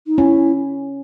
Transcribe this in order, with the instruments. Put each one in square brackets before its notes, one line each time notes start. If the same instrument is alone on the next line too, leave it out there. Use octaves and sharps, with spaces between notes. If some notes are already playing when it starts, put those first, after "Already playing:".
[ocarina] D#4
[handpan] C#4 [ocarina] E4